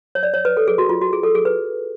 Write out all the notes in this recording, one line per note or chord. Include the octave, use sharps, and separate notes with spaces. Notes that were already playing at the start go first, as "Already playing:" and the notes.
C#5
D5
C#5
B4
A4
G#4
F#4
F4
F#4
G#4
A4
G#4
B4